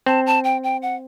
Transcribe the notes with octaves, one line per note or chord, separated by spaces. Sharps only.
C4 A5
A5
G5
G5
F#5